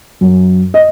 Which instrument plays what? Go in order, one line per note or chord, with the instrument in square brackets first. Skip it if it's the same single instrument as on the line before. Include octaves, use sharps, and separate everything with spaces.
[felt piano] F#2
D#5